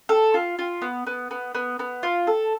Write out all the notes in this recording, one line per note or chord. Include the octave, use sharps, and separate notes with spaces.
A4
F4
F4
B3
B3
B3
B3
B3
F4
A4